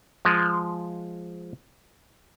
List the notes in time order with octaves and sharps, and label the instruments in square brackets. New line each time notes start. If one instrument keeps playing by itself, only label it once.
[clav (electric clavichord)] F3 G#3